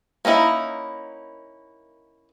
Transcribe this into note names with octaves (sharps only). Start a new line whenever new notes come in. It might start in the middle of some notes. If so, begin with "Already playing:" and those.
A#3 C#4 D#4 E4